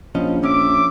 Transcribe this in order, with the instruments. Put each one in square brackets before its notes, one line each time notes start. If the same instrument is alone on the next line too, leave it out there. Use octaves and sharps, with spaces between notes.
[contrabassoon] A#1 [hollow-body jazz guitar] F3 C#4 D#5
[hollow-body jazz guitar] C#4 [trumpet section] E5 D6